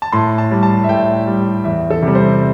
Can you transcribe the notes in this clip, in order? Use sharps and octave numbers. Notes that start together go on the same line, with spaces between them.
A5
A2 C6
A5
G3
A5
E5
A2 G5
G3
E2 E5
A4
C3 G3
C5